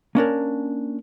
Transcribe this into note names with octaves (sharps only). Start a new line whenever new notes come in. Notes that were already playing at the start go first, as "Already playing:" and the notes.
A#3 C#4 D4 A#4